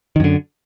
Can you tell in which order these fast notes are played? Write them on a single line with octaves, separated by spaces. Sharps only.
D#3 F#2 D3